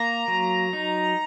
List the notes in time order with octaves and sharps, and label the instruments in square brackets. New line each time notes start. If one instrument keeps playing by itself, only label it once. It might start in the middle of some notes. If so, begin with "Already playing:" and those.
Already playing: [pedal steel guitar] A#3 [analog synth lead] A#5
[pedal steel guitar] F#3
D#4